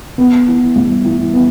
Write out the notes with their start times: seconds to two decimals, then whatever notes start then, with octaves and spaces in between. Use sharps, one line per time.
0.18 B3
0.47 E3
0.76 G3
1.05 E3
1.34 B3